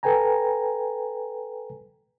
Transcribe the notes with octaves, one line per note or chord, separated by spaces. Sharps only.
A4 B4 G5 G#5 A#5